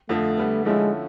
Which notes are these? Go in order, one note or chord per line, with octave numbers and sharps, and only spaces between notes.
F2 D3 F3 A3
D3 G3 B3
D3 F3 G#3 A3 C#4 E4